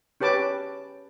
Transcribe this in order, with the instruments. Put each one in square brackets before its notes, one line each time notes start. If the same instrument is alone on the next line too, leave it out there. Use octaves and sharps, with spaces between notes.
[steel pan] C#4 G4 B4 A5 D6